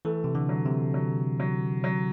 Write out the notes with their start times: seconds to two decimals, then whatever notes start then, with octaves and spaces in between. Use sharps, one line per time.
0.05 E3 A3
0.24 C3
0.35 D3
0.49 F#3
0.65 C3
0.94 F#3
1.40 F#3
1.84 F#3